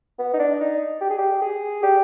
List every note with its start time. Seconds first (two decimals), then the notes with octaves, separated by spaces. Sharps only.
0.19 B3
0.33 D#4
0.39 D4
0.60 D#4
1.01 G4
1.10 G#4
1.18 G4
1.42 G#4
1.83 G4